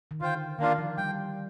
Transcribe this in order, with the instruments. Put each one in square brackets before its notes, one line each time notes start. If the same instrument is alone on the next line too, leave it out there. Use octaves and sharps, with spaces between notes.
[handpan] D#3
[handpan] D3 [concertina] F4 C5 G5
[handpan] D#3 [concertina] A#3 D4 F4
[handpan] F3
[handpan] G3 [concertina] G5